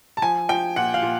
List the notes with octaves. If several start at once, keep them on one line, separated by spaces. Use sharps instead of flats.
A5
F3 G#5
F3 G5
A#2 F#5
F5
A#2